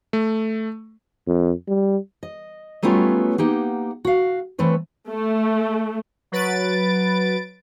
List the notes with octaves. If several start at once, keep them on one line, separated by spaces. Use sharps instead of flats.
A3
F2
G3
D#5
F#3 G3 A3 B3 C#4 F4
A#3 D#4 G4 F#5
F#4 F5
E3 A3 C4 B4 C#5
A3
F#3 B4 A6 D7